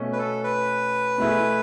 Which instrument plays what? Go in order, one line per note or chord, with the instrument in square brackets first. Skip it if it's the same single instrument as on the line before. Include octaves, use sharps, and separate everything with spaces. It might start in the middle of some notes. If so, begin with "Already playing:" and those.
Already playing: [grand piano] B2 A3 C#4
[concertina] B4
A4
B4
[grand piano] B2 A3 E4 G#4